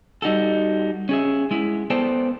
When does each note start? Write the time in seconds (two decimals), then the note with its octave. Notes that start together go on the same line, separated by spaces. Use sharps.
0.22 G3 D#4 F#4 A4
1.09 C#4 G#4 E5
1.51 G#3 E4
1.90 B3 A4 C5 D5 G5 A5